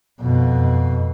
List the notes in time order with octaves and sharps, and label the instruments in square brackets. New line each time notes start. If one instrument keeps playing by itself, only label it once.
[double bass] F2 B2